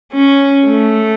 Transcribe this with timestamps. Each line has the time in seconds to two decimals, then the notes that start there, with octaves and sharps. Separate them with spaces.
0.13 C#4
0.67 A3